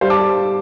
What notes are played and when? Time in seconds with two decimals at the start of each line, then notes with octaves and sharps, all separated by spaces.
0.01 G3 C5 F5
0.10 A5 D6